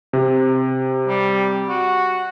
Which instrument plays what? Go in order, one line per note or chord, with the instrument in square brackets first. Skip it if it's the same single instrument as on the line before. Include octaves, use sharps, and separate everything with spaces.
[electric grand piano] C3
[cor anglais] G3
F#4